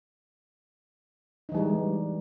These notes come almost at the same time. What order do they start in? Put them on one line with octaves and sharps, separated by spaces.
D#4 E3 G3 G#3